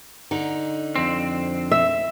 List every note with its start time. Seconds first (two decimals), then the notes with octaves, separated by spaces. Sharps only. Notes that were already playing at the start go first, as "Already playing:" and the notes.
0.31 D3 D#4
0.96 F2 C4
1.72 E5